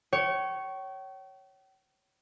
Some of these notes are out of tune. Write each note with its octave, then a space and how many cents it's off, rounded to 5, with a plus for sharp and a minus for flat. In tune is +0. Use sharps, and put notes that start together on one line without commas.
C#5 +0 G5 -40